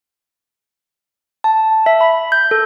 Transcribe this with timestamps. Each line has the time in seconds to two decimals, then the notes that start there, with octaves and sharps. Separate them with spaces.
1.44 A5
1.86 E5
2.01 B5
2.32 G6
2.51 A4